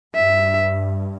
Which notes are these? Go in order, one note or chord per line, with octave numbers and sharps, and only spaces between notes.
G2 E5